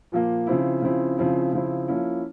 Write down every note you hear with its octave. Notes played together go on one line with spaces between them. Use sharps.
A#2 F3 A#3
C#3 F3 C4 E4
C#3 F3 C4 E4
C#3 F3 C4 E4
C#3 F3 C4 E4
F3 A#3 C#4 E4